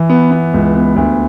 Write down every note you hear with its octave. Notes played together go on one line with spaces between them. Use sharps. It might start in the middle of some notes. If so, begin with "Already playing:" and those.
Already playing: E3
B3
B3
C#2
B3
D2